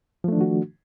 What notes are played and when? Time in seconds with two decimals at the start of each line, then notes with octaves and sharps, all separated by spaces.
0.24 F3
0.28 A3
0.32 D4
0.37 D#3
0.41 F#4